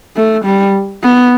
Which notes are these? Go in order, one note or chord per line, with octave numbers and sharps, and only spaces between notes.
A3
G3
B3